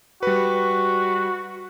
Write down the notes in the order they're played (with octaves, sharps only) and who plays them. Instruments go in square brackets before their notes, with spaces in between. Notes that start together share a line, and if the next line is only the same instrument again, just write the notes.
[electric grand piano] G3 B4 [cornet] F#4